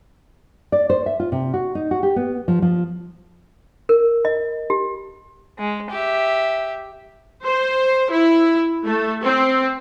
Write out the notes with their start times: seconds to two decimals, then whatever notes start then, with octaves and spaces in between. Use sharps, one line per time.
0.72 D5
0.90 C5
1.06 E5
1.20 F4
1.32 C3
1.54 F#4
1.75 D#4
1.91 F#4
2.03 G4
2.16 B3
2.48 F3
2.62 F3
3.89 A#4
4.25 D#5
4.70 G4
5.59 G#3
5.90 G4 E5
7.45 C5
8.11 E4
8.85 A3
9.23 C4